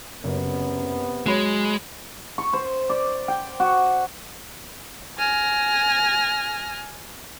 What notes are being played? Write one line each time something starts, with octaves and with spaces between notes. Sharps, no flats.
F#1 F#2 C3 B3
F#3 G#3 C#5 B5
C#6
C5
D5
G5
F#4
G#5 F6 A#6